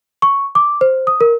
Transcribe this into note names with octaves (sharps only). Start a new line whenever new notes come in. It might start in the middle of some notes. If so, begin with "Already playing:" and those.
C#6
D6
C5
D#6
A#4